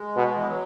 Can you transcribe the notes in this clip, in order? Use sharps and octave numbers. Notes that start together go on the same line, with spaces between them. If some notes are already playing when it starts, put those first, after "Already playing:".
Already playing: G#3
B2
E3
F#3